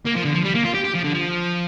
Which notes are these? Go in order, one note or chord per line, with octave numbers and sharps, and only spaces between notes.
A#3
F3
D3
F3
G3
A#3
F4
G4
G4
F3
D3
F3